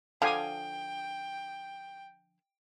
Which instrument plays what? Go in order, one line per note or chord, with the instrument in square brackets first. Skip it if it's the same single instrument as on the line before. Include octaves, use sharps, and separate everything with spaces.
[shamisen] D3 F3 D4 [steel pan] F5 G#5 D#6 [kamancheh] G5